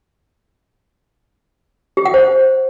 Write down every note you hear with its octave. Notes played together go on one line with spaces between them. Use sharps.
G4
F#5
C5